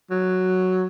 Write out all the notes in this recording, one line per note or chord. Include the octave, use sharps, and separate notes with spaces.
F#3